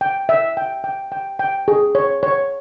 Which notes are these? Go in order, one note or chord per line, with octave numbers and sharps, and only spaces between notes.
G5
E5
G5
G5
G5
G5
G#4
C#5
C#5